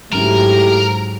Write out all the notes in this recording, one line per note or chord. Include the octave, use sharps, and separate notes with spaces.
G#2 F#3 A3 C#4 E4 G4 A#4